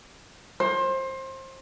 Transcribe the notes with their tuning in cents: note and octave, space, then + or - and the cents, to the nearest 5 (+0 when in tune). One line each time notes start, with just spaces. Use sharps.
C5 +25